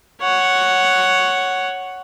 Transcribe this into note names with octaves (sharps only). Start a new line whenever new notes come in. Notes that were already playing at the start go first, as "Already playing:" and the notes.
C#5 F#5